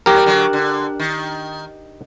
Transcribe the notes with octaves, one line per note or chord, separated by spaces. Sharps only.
F#3 G4 A#4
G3
D3 F#3
D3
D#3